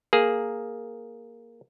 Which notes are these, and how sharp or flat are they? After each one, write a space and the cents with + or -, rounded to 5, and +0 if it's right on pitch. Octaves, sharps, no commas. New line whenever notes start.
A#3 +0 G#4 +0